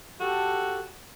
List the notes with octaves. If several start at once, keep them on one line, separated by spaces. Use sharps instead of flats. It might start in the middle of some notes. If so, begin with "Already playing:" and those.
F#4 G4 A4